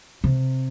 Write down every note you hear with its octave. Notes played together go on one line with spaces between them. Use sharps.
C3